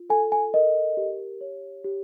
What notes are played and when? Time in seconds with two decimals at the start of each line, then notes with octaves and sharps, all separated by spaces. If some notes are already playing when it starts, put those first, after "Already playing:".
Already playing: F4
0.10 A4 G#5
0.32 G#5
0.54 A#4 D#5
0.97 G4
1.41 C#5
1.84 G4